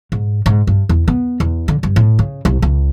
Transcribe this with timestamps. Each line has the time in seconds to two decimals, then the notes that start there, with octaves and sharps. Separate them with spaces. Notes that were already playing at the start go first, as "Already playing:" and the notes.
0.12 G#2
0.46 G#2
0.67 G2
0.89 E2
1.08 B3
1.40 E2
1.68 D3
1.83 G2
1.96 A2
2.19 C#3
2.45 C2
2.62 C#2